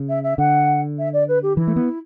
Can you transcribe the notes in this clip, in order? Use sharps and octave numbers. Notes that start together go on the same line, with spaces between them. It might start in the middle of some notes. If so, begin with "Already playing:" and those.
Already playing: C#3
E5
E5
D3 F#5
E5
D5
B4
G4
E3 E4
A3
B3